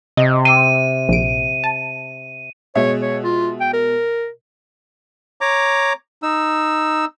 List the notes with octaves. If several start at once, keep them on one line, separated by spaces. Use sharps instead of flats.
C3 D#5
C6 D6 E6 D#7
A#1 D7
A5
B2 G#3 C#5 E5
C#5
F4
G5
A#4
C#5 A#5 D6
D#4 E6